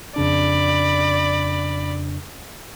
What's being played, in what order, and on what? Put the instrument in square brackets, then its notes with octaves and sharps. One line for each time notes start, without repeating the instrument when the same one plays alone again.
[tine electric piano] F2 C#3 D4 [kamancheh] D5 B5